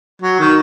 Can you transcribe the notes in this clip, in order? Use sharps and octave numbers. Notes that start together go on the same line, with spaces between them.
F#3
D#3